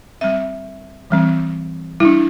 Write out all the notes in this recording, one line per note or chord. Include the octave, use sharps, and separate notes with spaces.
G3 C4 E5
E3 G3 C4
G3 D4 E4